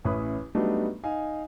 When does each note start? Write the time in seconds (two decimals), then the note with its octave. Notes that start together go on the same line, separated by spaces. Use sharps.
0.05 A1 C#4 E4 B4 B5 D#6
0.55 F#3 G3 A3 B3 D4 D#4
1.04 D#4 F5 G#5